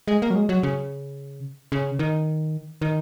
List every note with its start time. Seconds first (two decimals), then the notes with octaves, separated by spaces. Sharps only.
0.08 G#3
0.22 A#3
0.30 F#3
0.35 G#3
0.49 F#3
0.63 C#3
1.72 C#3
1.99 D#3
2.81 D#3